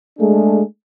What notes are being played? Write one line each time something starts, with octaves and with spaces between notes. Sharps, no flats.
G#3 A3 D4 G#4